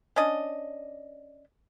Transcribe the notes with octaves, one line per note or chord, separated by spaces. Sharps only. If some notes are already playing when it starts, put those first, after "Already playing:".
C#4 D4 D#5